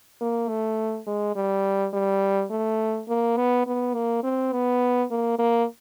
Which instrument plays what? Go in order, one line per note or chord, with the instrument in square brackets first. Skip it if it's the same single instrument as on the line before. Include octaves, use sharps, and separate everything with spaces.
[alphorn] A#3
A3
G#3
G3
G3
A3
A#3
B3
B3
A#3
C4
B3
A#3
A#3